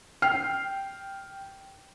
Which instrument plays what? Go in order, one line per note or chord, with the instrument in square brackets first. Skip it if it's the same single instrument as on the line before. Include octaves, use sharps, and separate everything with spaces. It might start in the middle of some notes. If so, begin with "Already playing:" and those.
[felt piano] G5 F6 C7